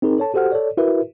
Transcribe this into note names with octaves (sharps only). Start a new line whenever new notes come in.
C4 D#4 G#4 A#4
A4 C#5 A5
F#4 G4 A4 C5 F#5 F6
A4 C#5 D5
E4 F#4 A#4 B4 E5